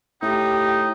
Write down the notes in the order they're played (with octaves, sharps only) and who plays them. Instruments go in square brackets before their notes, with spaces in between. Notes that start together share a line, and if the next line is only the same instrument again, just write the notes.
[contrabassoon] A2 [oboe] D#4 [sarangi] G4